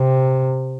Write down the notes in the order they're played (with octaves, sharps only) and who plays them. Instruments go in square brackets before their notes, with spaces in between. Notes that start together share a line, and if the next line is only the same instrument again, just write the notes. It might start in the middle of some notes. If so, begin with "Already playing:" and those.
Already playing: [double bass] C3